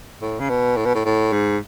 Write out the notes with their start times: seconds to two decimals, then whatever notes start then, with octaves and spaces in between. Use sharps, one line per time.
0.21 A2
0.40 C#3
0.49 B2
0.77 A2
0.85 B2
0.95 A2
1.05 A2
1.33 G#2